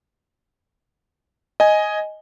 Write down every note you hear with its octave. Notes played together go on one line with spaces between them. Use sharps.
D#5 G#5